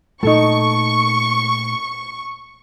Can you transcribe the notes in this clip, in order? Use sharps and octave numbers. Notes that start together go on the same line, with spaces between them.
A#2 A3 D#4 A4 C#6